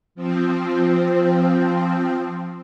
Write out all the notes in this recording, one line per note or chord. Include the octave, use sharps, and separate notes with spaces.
F3 C4